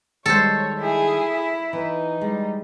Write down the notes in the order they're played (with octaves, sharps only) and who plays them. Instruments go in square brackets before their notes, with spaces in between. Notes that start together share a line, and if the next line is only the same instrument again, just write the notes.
[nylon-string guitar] D#3 G3 G#3 [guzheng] A4 C5 [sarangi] C#5
[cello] E4 [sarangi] G#4
[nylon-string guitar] E3 [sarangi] D#4
[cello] G3 [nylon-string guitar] G#3